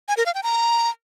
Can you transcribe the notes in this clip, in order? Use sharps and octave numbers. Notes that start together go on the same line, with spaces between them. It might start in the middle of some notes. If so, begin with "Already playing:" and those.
G#5
A#4
F5
G5
A#5